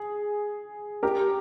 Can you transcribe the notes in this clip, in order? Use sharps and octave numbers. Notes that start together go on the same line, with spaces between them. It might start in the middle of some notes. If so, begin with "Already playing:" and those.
Already playing: G#4
G4 A#4